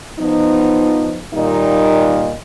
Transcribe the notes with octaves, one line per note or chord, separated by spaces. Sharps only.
F3 B3 D#4
A#2 D#3 G3 A#3 D#4 D#5